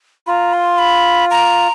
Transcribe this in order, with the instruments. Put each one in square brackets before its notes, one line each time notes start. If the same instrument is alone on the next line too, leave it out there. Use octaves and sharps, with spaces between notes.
[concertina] F4 [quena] A#5 B5
[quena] C6
B5
A#5